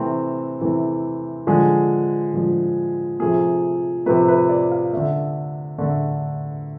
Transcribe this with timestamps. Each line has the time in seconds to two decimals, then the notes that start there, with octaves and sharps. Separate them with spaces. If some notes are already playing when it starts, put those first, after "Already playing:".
Already playing: C3 E3 A3 C4
0.61 C3 E3 A3
1.47 D3 F3 G#3 G#4
2.33 D3 F3 G#3
3.20 C3 F3 A3 G#4
4.06 C3 F3 A3 B4
4.28 B4
4.49 D5
4.71 F5
4.93 D3 A3 E5
5.78 D3 A3